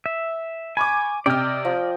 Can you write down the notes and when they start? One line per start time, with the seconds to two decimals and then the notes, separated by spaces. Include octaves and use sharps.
0.06 E5
0.77 G#5 B5 C#6 D6
1.26 C3 D5 D#5 G5 F6
1.65 F3